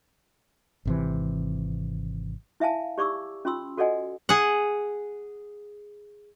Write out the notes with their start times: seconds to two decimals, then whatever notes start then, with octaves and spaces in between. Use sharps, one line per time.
0.85 G#1 C3 E3
2.60 E4 E5 F5 G#5 A5
2.98 G4 D5 C#6 D6 E6
3.45 C#4 F4 C6 E6
3.77 F#4 A4 D5 D#5 F#5 G#5
4.29 G#4 F#5